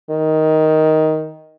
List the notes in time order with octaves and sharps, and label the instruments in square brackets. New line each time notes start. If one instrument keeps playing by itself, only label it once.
[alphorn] D#3